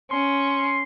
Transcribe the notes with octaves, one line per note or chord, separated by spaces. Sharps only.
C#4 C6